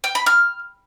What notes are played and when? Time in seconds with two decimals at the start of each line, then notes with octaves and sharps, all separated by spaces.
0.04 G5
0.15 B5
0.26 F6